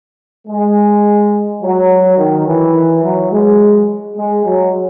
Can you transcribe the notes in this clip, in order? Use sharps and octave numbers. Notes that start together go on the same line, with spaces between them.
G#3
F#3
D#3
E3
F#3
G#3
G#3
F#3